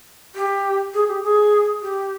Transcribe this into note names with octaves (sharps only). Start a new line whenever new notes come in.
G4
G#4
G4
G#4
G4